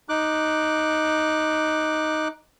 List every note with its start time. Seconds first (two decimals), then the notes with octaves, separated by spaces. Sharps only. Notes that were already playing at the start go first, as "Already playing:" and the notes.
0.09 D#4 D6 F#6